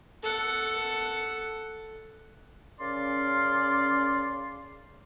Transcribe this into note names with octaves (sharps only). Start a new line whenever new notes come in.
A4 F#5
C#3 C#4 A#4 D5 C6